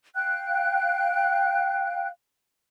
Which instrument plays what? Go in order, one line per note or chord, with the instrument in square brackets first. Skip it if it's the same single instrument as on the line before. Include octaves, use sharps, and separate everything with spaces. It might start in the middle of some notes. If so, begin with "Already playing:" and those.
[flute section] F5 G5 F#6